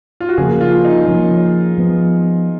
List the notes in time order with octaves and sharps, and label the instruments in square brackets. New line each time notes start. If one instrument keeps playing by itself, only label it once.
[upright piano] F4
F#4
[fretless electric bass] C#3 F3 A#3 [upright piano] G#4
[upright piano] F4
D#4
[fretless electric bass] F3 A#3 C#4
F3 B3